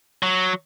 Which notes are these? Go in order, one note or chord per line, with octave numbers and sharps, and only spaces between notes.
F#3